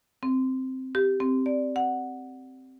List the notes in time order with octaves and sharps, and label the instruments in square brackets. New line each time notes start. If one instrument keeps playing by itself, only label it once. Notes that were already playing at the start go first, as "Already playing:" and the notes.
[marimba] C4
G4
C4
D5
F#5